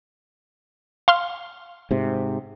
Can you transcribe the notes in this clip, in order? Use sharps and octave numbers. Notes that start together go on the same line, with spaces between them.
F5 C6 F6
G#2 C3